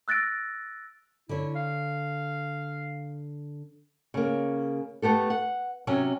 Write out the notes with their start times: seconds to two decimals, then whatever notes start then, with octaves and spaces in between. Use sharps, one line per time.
0.08 E6 F#6 A6 A#6 D7
1.29 D3 E4 C#5
1.55 F5
4.14 C#3 A#3
5.02 A3 B3 G4 A4
5.30 F#5
5.87 C3 F#3 C#4